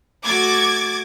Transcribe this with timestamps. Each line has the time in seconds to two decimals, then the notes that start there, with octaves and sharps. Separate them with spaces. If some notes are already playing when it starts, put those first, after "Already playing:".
0.24 A3 F#4 D6 G#6 A6